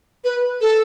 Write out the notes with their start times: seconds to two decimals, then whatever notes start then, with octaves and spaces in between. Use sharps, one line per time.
0.24 B4
0.61 A4